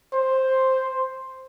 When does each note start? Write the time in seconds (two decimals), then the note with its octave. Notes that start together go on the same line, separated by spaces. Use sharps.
0.13 C5